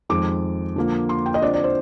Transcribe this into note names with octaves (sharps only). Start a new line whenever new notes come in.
F2 D#3 G#3 D6
D3 F3 A#3
C6
G5
D#5
D3 F3 C4 D5
D5
C5